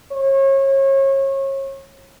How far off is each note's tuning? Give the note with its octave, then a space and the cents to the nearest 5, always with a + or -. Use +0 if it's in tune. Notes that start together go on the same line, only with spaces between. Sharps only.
C#5 -30